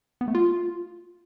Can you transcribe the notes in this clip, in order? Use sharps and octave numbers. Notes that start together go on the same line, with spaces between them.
B3
A3
F4